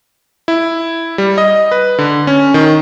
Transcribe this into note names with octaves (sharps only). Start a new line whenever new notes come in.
E4
G3
D#5
B4
D3
C#4
D#3